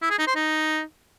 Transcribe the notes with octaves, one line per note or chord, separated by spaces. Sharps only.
E4
G#4
D#4
C5
D#4